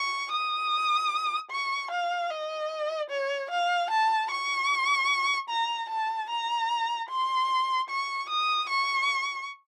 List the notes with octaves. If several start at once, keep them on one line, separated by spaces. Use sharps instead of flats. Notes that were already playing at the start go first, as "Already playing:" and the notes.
Already playing: C#6
D#6
C#6
F5
D#5
C#5
F5
A5
C#6
A#5
A5
A#5
C6
C#6
D#6
C#6